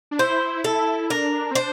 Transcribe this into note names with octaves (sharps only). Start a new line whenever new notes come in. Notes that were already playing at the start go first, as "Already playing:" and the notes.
D4
E4 C5
A4
D4 A#4
C4
D4 C5